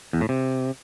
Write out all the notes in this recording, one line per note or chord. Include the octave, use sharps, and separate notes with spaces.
E2
A2
C3